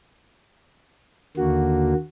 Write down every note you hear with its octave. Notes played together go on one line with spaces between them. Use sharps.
D#2 D3 A#3 F#4